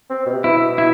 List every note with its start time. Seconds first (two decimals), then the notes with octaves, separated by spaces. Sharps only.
0.10 C4
0.26 B2
0.33 C3
0.44 B2 E4
0.78 E4